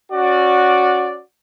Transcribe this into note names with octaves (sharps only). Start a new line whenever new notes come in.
C#4 F#4 D5